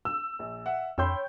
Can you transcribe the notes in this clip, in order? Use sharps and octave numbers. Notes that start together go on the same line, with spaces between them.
E6
A#1
E5 F#5
F2 C#5 G5 B5 C6 E6 G6